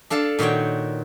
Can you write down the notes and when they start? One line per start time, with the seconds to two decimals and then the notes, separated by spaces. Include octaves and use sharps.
0.10 D4 A4 F5 A5
0.39 A#2 D#3 F#4 C#5 G5